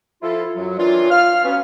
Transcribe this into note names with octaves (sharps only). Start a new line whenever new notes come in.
F3 E4 F4 A4
F#2 F#3
D#3 E3 C#4 D4 F4
F5 F6
F#3 B3 C#4